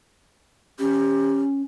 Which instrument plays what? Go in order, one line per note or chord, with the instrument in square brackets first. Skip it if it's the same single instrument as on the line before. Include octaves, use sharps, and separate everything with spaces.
[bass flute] C#4 [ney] G4